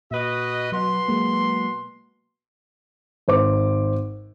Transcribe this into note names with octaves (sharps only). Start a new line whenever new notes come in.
A#2 F#4 B4 D#5
B2 F#3 C6
F#3 G#3 A#3
G#1 C5 D6